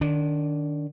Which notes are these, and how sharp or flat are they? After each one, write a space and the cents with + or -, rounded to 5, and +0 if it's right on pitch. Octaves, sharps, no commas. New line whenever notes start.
D#3 -30 D4 -15